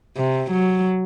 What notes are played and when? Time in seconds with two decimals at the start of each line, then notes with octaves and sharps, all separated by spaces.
0.17 C3
0.51 F#3